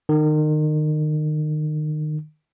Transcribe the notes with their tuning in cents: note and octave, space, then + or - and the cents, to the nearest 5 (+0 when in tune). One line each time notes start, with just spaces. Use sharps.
D#3 -30